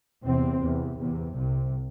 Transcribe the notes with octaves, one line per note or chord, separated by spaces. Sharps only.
E2 C3 C4
E2 C3
E2 C3
C2 C3